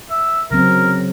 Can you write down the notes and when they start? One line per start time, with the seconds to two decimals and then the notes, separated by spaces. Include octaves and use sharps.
0.11 E5
0.51 C#3 F#3 C4 A#4